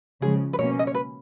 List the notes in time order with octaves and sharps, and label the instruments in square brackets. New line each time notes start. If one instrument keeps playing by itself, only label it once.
[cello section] C#3 F3 G#3 [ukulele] G#4
[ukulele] B4
[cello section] B2 A#3 C#4 [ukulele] C#5
[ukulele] D#5
C#5
B4